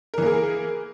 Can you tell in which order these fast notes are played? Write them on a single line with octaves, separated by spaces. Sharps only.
A#4 E3 A#3 G#4